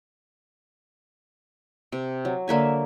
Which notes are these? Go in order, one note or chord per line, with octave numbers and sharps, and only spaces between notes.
C3
F#3
D3 A#3 E5 G#5